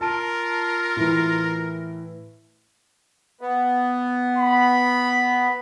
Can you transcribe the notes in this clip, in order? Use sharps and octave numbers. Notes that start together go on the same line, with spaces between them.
F4 A#4 A5 D7
A2 E3
B3
B5